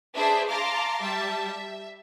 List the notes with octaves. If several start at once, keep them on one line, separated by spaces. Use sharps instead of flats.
D4 G#4 B4 C5 E5
F5 A5 A#5 C6 D6
G3 E5 A5
E5